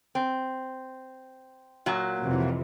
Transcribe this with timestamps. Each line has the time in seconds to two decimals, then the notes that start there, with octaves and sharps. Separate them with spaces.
0.15 C4
1.86 A#2 F#3
2.24 F2 C3 E3